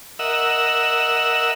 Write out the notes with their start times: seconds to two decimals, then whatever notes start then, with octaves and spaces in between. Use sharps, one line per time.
0.19 A#4 D#5 E5 F#5 E6